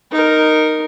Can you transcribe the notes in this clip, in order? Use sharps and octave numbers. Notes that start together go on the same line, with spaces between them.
D#4 A#4